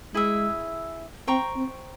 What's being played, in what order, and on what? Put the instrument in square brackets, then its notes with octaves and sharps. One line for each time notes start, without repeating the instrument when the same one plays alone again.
[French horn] G#3 [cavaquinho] E4 G#4 E5
[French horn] C4 [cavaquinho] C5 G5 A#5 C#6
[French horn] C4